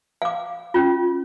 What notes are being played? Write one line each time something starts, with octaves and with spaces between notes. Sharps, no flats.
F5 D6
C#4 F4